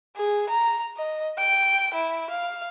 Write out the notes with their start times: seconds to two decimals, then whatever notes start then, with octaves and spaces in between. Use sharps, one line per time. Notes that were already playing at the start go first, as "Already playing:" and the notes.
0.16 G#4
0.49 A#5
0.97 D#5
1.38 G5
1.94 E4
2.30 F5